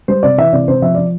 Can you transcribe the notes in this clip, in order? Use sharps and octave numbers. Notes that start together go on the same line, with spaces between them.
G3 C5
C3 D5
E3 E5
C3 D5
C3 C5
F3 E5
F3 D5